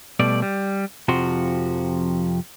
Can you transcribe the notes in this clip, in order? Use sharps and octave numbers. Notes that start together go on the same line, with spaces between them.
B2 G3 A3 D5
G3
F2 C3 F3 F#4 C6